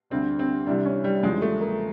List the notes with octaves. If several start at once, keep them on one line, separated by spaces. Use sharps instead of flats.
D2 D3 G3 C4
C4
C2 C3 E3 G3 D4
C#4
G3
E2 C#3 F3 G#3
A3
A#3